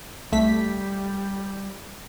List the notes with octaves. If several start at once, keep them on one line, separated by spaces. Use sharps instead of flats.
C2 G3 A3 B6